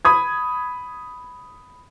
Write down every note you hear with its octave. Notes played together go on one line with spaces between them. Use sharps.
B5 D#6 G#6